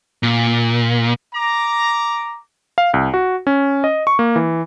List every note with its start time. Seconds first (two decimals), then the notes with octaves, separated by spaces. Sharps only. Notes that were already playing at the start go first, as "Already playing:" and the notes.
0.23 A#2
1.35 A#5 D6
2.78 F5
2.94 C2
3.14 F#4
3.47 C#4
3.84 D#5
4.07 C#6
4.19 A#3
4.36 E3